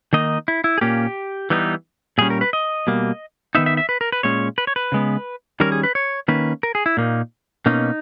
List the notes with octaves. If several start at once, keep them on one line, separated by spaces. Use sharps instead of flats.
D#3 A#3 D#4 D#5
E4
E4
G#4
A#2 A#3 C#4 G4
E3 G3 B3 D#4
A#2 G3 C#4 G#4
A#4
B4
D#5
B2 G3 A#3
D#3 G3 B3 D#4 E5
E5
E5
B4
A#4
B4
A#2 G#3 C#4 C#5
B4
C#5
B4
C#3 G#3 B3
D#3 G3 C#4 A#4
G#4
B4
C#5
D#3 A#3 C#4 B4
A#4
G#4
E4
A#2 A#3 D#4
B2 A#3 C#4 D#4